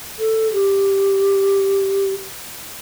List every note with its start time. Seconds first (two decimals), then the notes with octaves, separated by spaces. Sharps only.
0.19 A4
0.53 G4